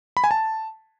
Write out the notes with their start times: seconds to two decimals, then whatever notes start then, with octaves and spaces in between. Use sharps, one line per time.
0.17 B5
0.24 G#5
0.31 A5